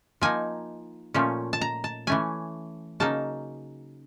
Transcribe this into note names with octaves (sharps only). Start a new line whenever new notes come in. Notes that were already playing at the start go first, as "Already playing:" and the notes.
F3 A#3 D#4 G#5
A#2 F3 A3 C#4
A5
A#5
A5
E3 A3 C#4 G#5
C#3 F#3 A#3 D#4 A5